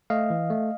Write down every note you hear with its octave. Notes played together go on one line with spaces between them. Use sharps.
A3 D#5 F5
E3
A3